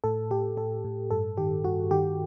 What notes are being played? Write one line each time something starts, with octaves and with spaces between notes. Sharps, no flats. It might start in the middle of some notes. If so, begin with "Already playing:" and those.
A2 A4
A2 G4
A2 A4
A2
G2 A4
D#3 G4
G2 F#4
D#3 G4